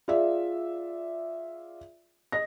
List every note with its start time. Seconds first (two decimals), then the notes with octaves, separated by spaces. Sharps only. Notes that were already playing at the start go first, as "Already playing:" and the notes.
0.08 F4 G#4 D5 E5
2.32 D#5 A#6